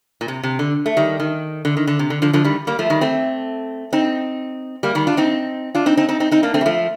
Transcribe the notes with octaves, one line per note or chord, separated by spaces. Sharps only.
A#2
C3
C3
D3
A3
D#3 G3
D#3
D3
D#3
D3
C3
D3
D3 F3
D3 F3
D#3 G3
G3 A#3
F3 A3
D#3 G3
A3 C4
C4 D#4
G3 A#3
D#3 G3
D4 F4
C4 D#4
D4 F4
C4 D#4
C4 D#4
C4 D#4
C4 D#4
C4 D#4
A#3 D4
A3 C4
G3
F3 A3